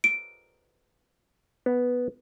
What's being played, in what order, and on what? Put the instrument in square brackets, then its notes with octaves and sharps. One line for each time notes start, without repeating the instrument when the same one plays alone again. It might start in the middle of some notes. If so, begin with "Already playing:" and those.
[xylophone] D7
[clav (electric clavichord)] B3